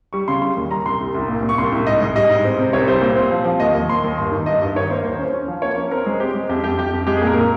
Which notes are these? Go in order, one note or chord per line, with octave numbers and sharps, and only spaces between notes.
G3 C#6
C#3 C6
G3 C6
D#2
G3 A#5
C2 C6
C2
C2
A#2
A#2
C#6
C2 C6
C2
G#2 D#5
G#2
G3 D#5
G#2
C4
C3
C2 C#5
G3 C5
A#2
C4
F3
F3
D#2 D#5
D#2
D#2 C6
D#2
G2
D#3
G2 D#5
G2
D#3 C#5
A#3 C5
D#2 C5
C#4
C#4
F3
A#3 C#5
C#4
C4 A#4
G#3
C4 G4
G#3
F2 G4
F2 G4
F2 G4
F2
G#3 G4
G#4
A#2
A#4
A#2